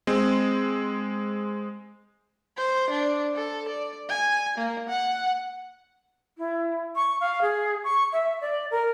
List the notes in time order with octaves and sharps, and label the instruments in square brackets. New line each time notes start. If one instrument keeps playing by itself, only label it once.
[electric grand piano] G#3 C4
[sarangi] C5
D4
A4
D5
G#5
A#3
F#5
[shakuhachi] E4
C#6
F5
G#4
C#6
E5
D5
A#4